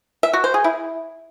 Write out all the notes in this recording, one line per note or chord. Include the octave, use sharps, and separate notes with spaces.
E5
F#4
C5
G#4
E4